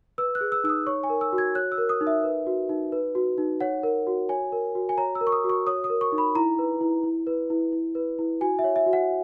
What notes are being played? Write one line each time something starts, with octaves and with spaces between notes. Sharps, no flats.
B4 E6
F#6
G#4
E6
D#4 E6
D#6
C#5 C#6
G#5
A#4
E6
F#4
G#6
C#5 F#6
E6
A#4
D#6
D#4
E5
B4
F#4
D#4
B4
F#4
D#4
C#5 F#5
A#4
F#4
C#5 G#5
A#4
F#4
G#5
C#5 A#5
E6
A#4
C#6
D#6
F#4
C#6
C#5 D#6
D#6
A#4
C#6
D#4
B5
E4 A#5
B4
E4
E4
B4
E4
E4
B4
E4
F#4 G#5
E5
C#5
E5
F#4
F#5